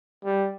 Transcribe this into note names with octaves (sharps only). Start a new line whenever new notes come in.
G3